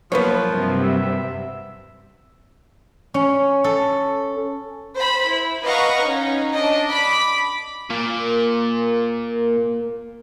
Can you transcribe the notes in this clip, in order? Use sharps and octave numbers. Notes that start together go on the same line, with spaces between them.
F3 F#3 A#3 B3 B4 C#5
G2 C3
E5
C#4
A4
C5 B5
E4
B4 D#5 F5 F#5 A#5 C#6
C#4 D#4
D4 D#5
B5 D6 B6
A#2 A#3